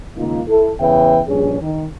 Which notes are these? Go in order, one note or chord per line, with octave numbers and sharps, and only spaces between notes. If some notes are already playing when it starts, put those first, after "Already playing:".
C#2 D#3 A#3 D#4 F4
E4 A4
E2 C#3 B4 E5 G5
A#1 G2 C#4 G#4
D#3